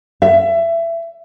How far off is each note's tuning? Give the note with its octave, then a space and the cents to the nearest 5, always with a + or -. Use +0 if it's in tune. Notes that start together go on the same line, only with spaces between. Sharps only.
E5 +25